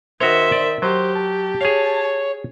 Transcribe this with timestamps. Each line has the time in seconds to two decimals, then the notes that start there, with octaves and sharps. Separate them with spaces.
0.20 D#3 F#4 C5 C#5 E5
0.52 D5
0.82 F#3 G4 C5
1.15 A5
1.61 G#4 C#5 F5